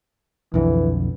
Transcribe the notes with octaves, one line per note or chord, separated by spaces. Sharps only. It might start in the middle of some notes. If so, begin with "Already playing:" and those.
B1 F2 D3 E3